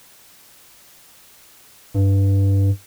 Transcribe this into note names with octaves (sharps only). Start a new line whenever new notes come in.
G2